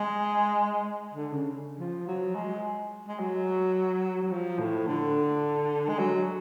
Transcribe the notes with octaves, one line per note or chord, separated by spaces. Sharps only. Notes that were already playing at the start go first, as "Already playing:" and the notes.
Already playing: G#3
D3
C#3
F3
F#3
G#3
G#3
F#3
F#3
F3
A2
D3
G#3
F#3